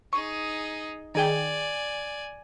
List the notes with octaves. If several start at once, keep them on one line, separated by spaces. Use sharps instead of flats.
D#4 G#4 C#6
D#3 G#4 D5 G5 G#5